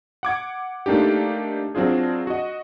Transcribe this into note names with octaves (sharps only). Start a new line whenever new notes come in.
F#5 D6 G#6
A3 A#3 D4 D#4 G4
F#3 C4 D4 F4 G#4
F#4 D#5